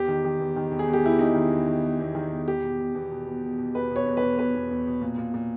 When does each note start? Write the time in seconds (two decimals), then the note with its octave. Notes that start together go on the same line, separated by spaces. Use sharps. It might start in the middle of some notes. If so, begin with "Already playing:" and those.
Already playing: E2 G4
0.08 D#3
0.24 D#3
0.39 E2
0.56 D#3
0.71 E2
0.79 G#4
0.88 E2
0.93 G4
1.04 E2 E4
1.19 D#3 D#4
1.35 D#3
1.51 E2
1.67 D#3
1.83 E2
2.00 E2
2.15 D#3
2.32 E2
2.48 E2 G4
2.63 B2
2.80 B2
2.95 E2
3.10 B2
3.27 B2
3.43 B2
3.58 B2
3.75 E2 B4
3.90 B2
3.96 C#5
4.06 E2
4.17 B4
4.22 E2
4.38 B2 B4
4.55 E2
4.71 E2
4.87 B2
5.01 A#2
5.18 A#2
5.34 A#2